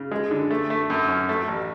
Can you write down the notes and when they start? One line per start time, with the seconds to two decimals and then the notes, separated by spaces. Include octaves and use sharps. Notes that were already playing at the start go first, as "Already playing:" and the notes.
Already playing: C#3
0.11 G#3
0.31 D3
0.51 A3
0.70 A3
0.90 F#2
1.08 C#4
1.29 A3
1.48 A1